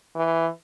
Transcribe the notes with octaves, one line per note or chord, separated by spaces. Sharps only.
E3